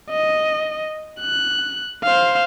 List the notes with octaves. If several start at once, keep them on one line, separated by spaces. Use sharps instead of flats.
D#5
F#6
C5 F5